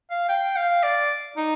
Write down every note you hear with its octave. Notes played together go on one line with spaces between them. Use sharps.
F5
G5
F5
D5
D#4